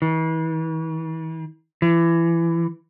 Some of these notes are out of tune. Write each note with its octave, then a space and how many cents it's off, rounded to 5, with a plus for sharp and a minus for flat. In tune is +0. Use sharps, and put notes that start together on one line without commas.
E3 -40
E3 +25